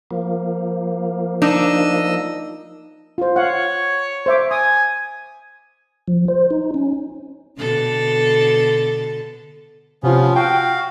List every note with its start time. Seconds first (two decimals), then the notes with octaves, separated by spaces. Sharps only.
0.11 F3 A#3
1.42 D4 D#4 D#5 E6
3.18 F4 C5
3.36 C#5 F5 F#5
4.26 C5 E5 D6
4.51 G#5 D#6
6.08 F3
6.28 C5
6.50 D#4
6.74 C#4
7.58 B2 D3 A4
10.03 C3 F3 B3 C#4 F4
10.35 F#4 F5 G5